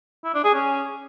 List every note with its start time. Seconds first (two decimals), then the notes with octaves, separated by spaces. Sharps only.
0.24 E4
0.34 D4
0.44 G#4
0.54 C#4